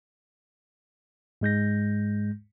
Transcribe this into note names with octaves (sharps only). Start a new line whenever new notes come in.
G#2 G#3 G6 A#6